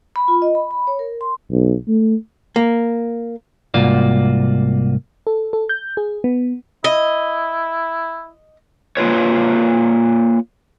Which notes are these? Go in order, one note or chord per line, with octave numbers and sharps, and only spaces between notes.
B5
F4
D#5
B5
B5
C#5
A#4
C6
B1
A3
A#3
C2 G#2 A#3 F4 F#4 D5
A4
A4
G6
G#4
B3
E4 D#5
A#3 F4 B4 C#5